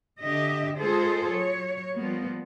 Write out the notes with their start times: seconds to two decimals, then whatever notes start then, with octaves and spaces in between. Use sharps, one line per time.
0.22 D3 G4 D#5 E5
0.80 G#3 F4 G#4 A4 C5
1.32 F#3 C#5
1.95 F3 G3 A#3 B3